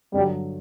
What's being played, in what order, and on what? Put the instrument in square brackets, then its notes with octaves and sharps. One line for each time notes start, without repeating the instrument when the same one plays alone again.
[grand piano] G2 D3 F#3 [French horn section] G3